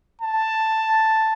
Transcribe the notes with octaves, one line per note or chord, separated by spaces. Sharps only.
A5